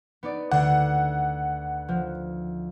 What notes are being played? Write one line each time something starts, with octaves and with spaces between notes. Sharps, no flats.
B3 D#4 D5
D2 D3 D5 F#5
F3